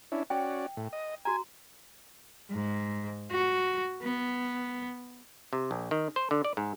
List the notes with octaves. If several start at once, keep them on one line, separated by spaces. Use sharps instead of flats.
C#4 D4 E4
C#4 F#4 D5 G5
A2
D#5
F#4 G#5 A#5
G#2
F#4
B3
C3
A#1
D#3
C5
D3
D5
G#2